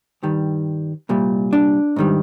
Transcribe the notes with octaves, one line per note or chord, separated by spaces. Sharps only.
G2 D#3 G3
C2 A#2 G3
D4
G#2 D#3 G3